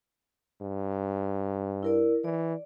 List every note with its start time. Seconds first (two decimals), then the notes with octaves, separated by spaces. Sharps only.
0.62 G2
1.83 E4 A#4 D5
2.24 E3 D5